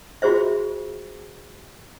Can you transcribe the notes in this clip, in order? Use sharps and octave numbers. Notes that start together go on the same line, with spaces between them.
F4 F#4 G#4 C5 E5